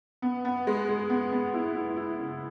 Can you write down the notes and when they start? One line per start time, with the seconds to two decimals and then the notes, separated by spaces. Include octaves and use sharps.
0.22 B3
0.45 B3
0.67 G#3
0.89 G#3
1.10 B3
1.32 B3
1.54 E4
1.75 E4
1.97 E4
2.19 C#3